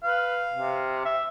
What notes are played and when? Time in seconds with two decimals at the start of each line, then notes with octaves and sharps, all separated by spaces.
0.04 B4 F5
0.52 C3
1.05 E5